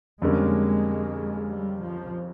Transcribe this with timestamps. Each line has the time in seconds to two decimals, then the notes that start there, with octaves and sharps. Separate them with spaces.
0.22 F2 D3 G3 G#3 A#3 C#4
1.49 G3
1.81 F3